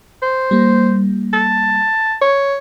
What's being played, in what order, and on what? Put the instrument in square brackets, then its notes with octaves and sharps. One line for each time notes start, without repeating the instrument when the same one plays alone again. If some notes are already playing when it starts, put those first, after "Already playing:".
[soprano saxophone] C5
[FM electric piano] G3 A#3
[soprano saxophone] A5
C#5